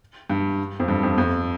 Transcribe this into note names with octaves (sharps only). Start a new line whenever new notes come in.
G2
F2
G2
F2
F2